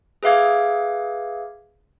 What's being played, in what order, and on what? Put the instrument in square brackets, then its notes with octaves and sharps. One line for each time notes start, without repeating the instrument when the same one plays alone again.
[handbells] G#4 B4 E5 F5 D6 G#6